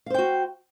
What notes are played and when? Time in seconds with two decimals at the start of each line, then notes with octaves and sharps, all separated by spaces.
0.06 F5
0.10 C5
0.14 G5
0.18 F#4